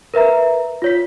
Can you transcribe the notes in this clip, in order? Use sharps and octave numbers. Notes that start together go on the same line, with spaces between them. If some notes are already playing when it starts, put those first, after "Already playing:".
A#4 B4 E5 A#5
F4 C#5 B6